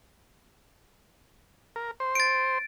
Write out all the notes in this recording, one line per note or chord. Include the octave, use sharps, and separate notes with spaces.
A#4
C5
A6 D7